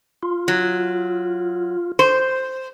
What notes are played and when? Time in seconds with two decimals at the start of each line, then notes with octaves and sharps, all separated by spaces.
0.23 F4
0.48 F#3
1.99 C5